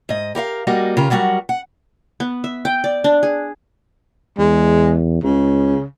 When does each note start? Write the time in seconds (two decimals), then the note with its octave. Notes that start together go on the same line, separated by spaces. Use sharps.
0.09 G#2 D#5
0.35 G4 A#4 C#5 F5
0.67 G3 A#3 F#4 D#5
0.97 C#3 F4 G4 A#4
1.10 F#3 G3 F#4 G#4 A#4 F#5
1.49 F#5
2.20 B3
2.44 E5
2.65 G5
2.84 D5
3.04 D4
3.23 G#4
4.38 E2 G#3
5.23 C#2 C#3